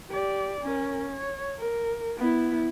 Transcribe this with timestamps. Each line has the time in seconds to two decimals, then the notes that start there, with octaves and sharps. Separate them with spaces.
0.10 G4 D5
0.61 C#4 A#4
1.12 C#5
1.58 A#4
2.17 B3 E4